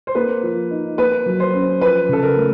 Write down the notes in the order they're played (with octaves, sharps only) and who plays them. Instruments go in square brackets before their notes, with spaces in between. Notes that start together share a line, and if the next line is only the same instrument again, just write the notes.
[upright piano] C5
[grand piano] A#3 [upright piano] B4
[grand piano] F3
D#4
[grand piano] A#3 [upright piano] B4
[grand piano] F#3
[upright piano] C5
[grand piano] C#4
[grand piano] F3 [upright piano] B4
[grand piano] C#3 [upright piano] A4
[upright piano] A#4
[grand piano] A3